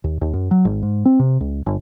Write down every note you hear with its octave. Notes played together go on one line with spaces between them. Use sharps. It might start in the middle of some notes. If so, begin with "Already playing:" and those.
D#2
D#2
F#2
F#3
G#1
G#2
C4
C3
C#2
G1